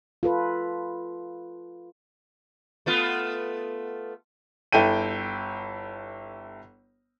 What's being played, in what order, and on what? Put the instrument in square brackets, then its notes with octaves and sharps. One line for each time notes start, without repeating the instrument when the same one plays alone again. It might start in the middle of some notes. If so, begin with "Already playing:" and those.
[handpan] F4 A4 B4
[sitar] A3 B3 F4
[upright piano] G1 E4 A4 G5 D#7